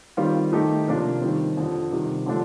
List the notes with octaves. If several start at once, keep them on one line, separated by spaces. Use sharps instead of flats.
D#3 G3 C4 F4
D#3 A3 D#4 G4
C3 F3 A#3 D4
D#3 G3 C4
F2 D3 F3
C3 D#3 G3
D3 F3 A3 D4